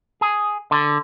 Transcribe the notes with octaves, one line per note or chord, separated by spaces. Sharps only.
G#4
D3